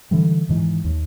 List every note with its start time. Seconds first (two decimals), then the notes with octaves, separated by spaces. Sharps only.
0.11 D3 E3 G3
0.49 G#2 D#3 E3
0.84 D#2